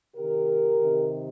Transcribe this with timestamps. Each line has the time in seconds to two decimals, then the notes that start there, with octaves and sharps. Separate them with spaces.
0.16 C3 D#3 G4 A#4
0.79 C3 D#3